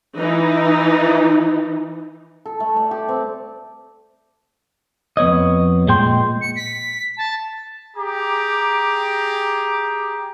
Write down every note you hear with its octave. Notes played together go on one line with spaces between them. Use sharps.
E3 D#4
A4
A3
D5
G4
C4
F2 B3 C#5 D#5
A#2 G#3 G5 C6
C#7
B6
A5
G4 G#4 A#5 D6